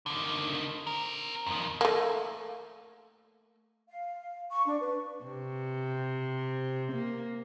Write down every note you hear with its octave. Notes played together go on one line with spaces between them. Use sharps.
D3 D#3
C4 A#4
F2 D#3
A3 A#3
F5
C#6
D4
B4
C3
A#3